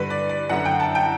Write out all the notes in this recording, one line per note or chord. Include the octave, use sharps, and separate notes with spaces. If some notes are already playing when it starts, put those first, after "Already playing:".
Already playing: G2 D3 B4
D5
D5
F#2 D3 F#5
G5
A5
G5